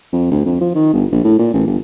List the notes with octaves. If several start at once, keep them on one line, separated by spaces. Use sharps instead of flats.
F2
D2
F2
F3
D#3
G1
A#1
A2
A#2
A1
G1